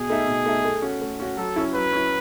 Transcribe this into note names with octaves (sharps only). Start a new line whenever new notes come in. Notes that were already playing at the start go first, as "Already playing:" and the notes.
Already playing: B2 G#4
A3 D#4 A4 E5
B2
A3 D#4 A4 E5
A3
C#4 F#4
A3
C#4 F#4
F#3 A4
C#4 E4
F#3 B4
C#4 E4